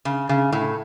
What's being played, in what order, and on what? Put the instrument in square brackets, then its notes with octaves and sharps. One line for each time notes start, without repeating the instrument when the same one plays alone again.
[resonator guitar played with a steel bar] C#3
C#3
A2